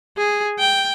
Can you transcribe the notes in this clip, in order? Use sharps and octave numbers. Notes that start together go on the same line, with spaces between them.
G#4
G5